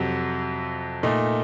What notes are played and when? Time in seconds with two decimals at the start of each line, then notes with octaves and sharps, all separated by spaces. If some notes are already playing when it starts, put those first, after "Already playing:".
Already playing: F2 C3 F#3
1.03 A#2 A3 D#4